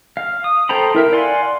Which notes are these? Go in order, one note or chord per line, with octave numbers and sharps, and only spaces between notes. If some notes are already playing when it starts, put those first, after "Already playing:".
F5
D#6
A4 C5 G5 A#5 B5
E4 A#4 E5
D5 F5 F#5 G#5 C6